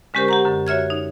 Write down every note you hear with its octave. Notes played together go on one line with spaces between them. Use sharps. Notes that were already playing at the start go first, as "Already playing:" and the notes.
D3 G#3 C#4 G4 A#4 C5
G4 F#5 A#5
F#2 D3
F#4 C#5 E5 F6 G#6
D#4